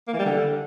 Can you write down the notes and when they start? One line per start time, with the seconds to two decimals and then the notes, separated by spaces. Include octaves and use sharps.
0.08 A#3
0.13 E3
0.19 G3
0.25 D3